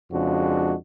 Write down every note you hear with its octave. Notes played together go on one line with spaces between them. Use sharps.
F2 C#3 G#3 D4 F#4